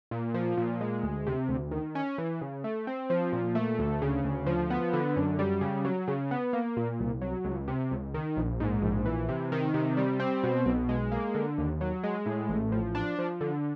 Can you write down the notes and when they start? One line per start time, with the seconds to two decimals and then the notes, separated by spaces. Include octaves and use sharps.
0.11 A#2
0.34 F3
0.57 A#2
0.81 G#3
1.03 D2
1.27 C3
1.48 D2
1.71 D#3
1.95 C#4
2.18 E3
2.41 C#3
2.64 A3
2.87 C4
3.10 F3
3.33 A#2
3.55 A3
3.79 D2
4.02 C#3
4.24 D2
4.46 F3
4.70 B3
4.93 D3
5.16 F#2
5.39 G3
5.61 C#3
5.85 F#3
6.08 C#3
6.31 B3
6.53 A#3
6.77 A#2
7.00 C2
7.21 F#3
7.45 C#2
7.68 C3
7.91 C#2
8.14 D#3
8.37 A#1
8.60 G#2
8.82 A#1
9.06 E3
9.29 C3
9.52 D#3
9.74 C3
9.97 G3
10.20 C4
10.43 B2
10.65 B1
10.89 G#3
11.12 A#3
11.35 D3
11.58 D#2
11.81 F#3
12.03 G#3
12.26 A2
12.49 A1
12.72 F3
12.95 D4
13.19 F3
13.41 D3